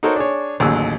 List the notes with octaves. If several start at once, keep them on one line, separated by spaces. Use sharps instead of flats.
D#4 F#4 A4 A#4 C5 C#5
D4 G#4 C#5
A1 D#2 D3 F#3 G#4 E6